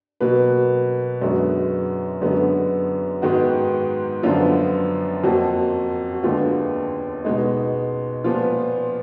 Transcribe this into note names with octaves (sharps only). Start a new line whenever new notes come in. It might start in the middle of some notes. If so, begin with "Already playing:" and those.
B2 F#3 A#3 B4
F#2 D3 G#3 B3 F#4
F#2 D3 G#3 B3
G#2 D#3 G#3 B3 F#4
F#2 D3 F3 B3 F4
F2 F3 A#3 F#4
F#4
D#2 D3 G#3 B3 F4
B2 G#3 B3 D#4
A#2 F3 B3 F4